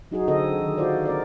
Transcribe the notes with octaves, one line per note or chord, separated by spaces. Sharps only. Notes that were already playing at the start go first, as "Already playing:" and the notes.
F#3 D#4 F#4 G#4
D3 C4 G#4 A4 D#5
D#3
F4 F#4 C5 D5
C4 A#4 D5